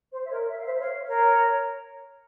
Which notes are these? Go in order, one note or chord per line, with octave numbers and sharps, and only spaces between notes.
C5
E5
A#4 C#5
E5
F5
C5 E5
C#5 F5
A#4 C#5